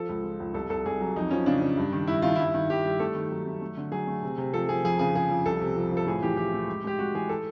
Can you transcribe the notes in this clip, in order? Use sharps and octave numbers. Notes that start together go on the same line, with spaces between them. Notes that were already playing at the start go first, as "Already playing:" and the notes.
Already playing: F3 A4
C#2
G#3
C#2
C2 A4
C2 A4
C2 G#4
F#3
F2 D#4
F3 C#4
C#3 D4
C#3
G2
D#3
G2 E4
D#3 F4
G2 E4
D#3
D#3 G4
G3
A3 A4
D#3
F#3
A3
A3
D3
F#3 G#4
A3
C3
C3
F3 A4
F3 G#4
F2 G#4
C#3 G#4
F3 G#4
F2
C2 A4
C3
F3
F3
A4
A2 G#4
E3 G4
E3 G4
A3
G#3
G#3 G4
G#3 F#4
E3 G#4
A4